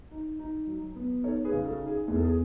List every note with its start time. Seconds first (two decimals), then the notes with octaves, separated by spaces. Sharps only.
0.11 D#4
0.39 D#4
0.67 F#3
0.96 B3
1.23 D#4 A4 C#5
1.44 G#4 B4
1.52 C#3
1.66 F#4 A4
1.80 D#4
1.87 G#4
2.08 E2 G#4
2.16 A4
2.25 G#4